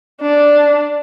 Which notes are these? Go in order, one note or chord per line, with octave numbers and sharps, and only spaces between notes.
D4